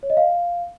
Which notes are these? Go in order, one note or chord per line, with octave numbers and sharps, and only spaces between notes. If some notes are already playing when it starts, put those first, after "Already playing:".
C#5
D#5
F5